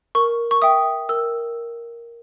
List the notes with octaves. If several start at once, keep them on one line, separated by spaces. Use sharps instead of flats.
A#4 C#6
C#6
E5 G5 D#6
A#4 E6